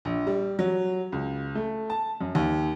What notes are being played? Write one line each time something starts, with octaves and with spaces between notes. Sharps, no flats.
A#1
G3
F#3
C#2
A3
A5
F#2
D#2